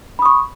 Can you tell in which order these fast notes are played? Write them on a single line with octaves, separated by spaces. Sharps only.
B5 D#6 C#6